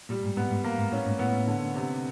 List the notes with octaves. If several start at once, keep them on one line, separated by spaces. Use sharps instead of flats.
A#2 G3
G#2
G#2 B3
G#2
A#3
G#2
A2 C#4
G#2
A2 B3
D3
C3